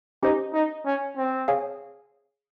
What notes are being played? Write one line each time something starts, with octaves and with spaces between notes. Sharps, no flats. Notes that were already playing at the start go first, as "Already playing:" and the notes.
C#4 D#4 G4 C5
D#4
C#4
C4
G#4 C#5 F5 G#5